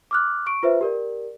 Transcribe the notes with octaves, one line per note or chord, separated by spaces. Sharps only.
D6 F6 F#6
C#6 D7
F4 B4 C5 E5
G4 A#4 D5